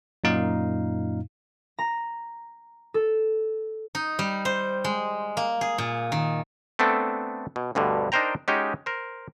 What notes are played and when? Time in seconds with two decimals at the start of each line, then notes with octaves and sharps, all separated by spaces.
0.24 F#2 A#2 D#4 F5
1.79 A#5
2.94 A4
3.95 D#4
4.19 G3
4.45 C5
4.84 G#3
5.37 A#3
5.61 G#4
5.78 A#2
6.12 D#3
6.79 A3 B3 C4 D4 A4
7.56 B2
7.75 D2 G2 B2 D3
8.12 D4 D#4 A#4 C5 G5 A#5
8.48 G#3 C#4 D#4 F#4 G4
8.86 A#4 C5